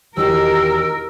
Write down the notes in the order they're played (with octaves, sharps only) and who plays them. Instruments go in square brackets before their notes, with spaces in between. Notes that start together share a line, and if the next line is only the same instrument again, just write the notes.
[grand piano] E1 D#3 D#5 [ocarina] G4 [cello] A#4 [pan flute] E6